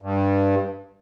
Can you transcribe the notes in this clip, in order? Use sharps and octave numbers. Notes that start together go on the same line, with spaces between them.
G2